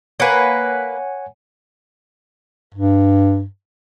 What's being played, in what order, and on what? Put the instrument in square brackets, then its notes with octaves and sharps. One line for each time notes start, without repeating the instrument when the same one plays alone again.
[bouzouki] A#3 B4 [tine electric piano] C#5 F#5 G#5
[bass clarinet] G2